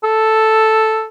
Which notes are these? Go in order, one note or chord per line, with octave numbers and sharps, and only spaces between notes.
A4